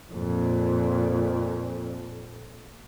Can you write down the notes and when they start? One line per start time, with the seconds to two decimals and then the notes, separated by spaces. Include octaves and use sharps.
0.12 F2 A#2